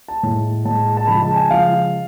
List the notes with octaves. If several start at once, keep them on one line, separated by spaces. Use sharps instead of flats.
A5
A2 G#3
A2 G#3 A5
A5
C#3 F3 G#3 B5
A5
G#5
C#3 F3 G#3 F5